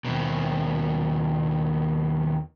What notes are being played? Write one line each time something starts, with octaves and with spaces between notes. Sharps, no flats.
D#2 B2